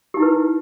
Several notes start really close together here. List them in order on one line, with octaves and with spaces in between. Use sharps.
G4 D#4 E4 B4